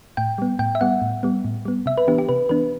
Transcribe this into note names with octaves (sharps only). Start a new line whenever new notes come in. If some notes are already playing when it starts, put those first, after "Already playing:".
A2 G5
G3 B3
A2 G5
E5
G3 B3 F#5
A2
G3 B3
A2
G3 B3
C3 E5
B4
E3 B3 D4 G4
G4
C3 B4
E3 B3 D4 B4